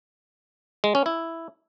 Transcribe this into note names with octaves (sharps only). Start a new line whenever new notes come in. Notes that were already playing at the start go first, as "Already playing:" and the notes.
G#3
C#4
E4